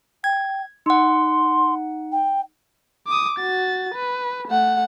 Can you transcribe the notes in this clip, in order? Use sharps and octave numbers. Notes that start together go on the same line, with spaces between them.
G5 G#6
D#4 F#5 C6
G5
D6 D#6
F#4 A6
B4
A3 F#5